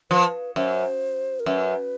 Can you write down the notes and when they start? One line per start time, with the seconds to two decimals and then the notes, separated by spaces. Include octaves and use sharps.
0.10 F3 B4
0.56 F#2 C5
1.40 A#4
1.46 F#2 B4